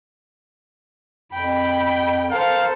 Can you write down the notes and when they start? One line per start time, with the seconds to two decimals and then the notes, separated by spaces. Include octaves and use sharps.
1.33 F2 G5 B5
2.31 A4 A#4 C5 F5